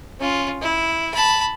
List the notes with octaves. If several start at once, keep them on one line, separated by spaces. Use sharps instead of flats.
C#4 F4
E4
A5 B5